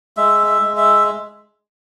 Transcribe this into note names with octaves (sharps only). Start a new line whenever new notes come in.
G#3 E5
E5
G#3
E5